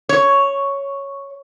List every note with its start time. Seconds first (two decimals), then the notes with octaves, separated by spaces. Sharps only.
0.09 C#5